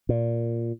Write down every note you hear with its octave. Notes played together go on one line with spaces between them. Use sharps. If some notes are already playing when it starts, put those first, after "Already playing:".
A#2